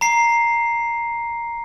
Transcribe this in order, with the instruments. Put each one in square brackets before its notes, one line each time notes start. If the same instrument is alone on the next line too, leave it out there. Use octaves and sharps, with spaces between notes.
[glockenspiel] A#5 C7